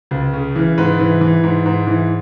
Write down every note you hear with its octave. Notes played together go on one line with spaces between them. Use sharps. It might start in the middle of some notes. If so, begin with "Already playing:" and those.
C#2
C#3
E3
G#2 B4
E3
E3
G#2
G#2
E3